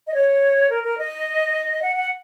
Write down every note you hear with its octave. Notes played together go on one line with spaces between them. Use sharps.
D#5
C#5
A#4
A#4
D#5
F#5
F#5